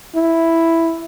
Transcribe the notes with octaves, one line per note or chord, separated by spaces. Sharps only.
E4